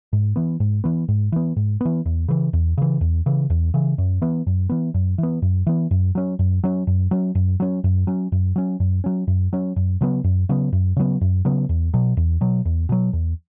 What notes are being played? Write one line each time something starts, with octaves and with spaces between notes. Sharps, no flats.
G#2
E3 B3
G#2
E3 B3
G#2
E3 B3
G#2
E3 B3
E2
C#3 E3
E2
C#3 E3
E2
C#3 E3
E2
C#3 E3
F#2
E3 B3
F#2
E3 B3
F#2
E3 B3
F#2
E3 B3
F#2
F#3 C#4
F#2
F#3 C#4
F#2
F#3 C#4
F#2
F#3 C#4
F#2
F#3 C#4
F#2
F#3 C#4
F#2
F#3 C#4
F#2
F#3 C#4
F#2
C#3 F#3 B3
F#2
C#3 F#3 B3
F#2
C#3 F#3 B3
F#2
C#3 F#3 B3
E2
B2 F#3
E2
B2 F#3
E2
B2 F#3
E2